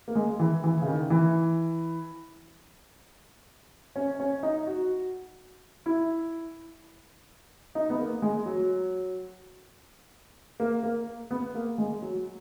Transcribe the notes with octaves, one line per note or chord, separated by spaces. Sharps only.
A#3
G#3
E3
E3
C#3
D#3
E3
C#4
C#4
D#4
F#4
E4
D#4
B3
A#3
G#3
F#3
A#3
A#3
B3
A#3
G#3
F#3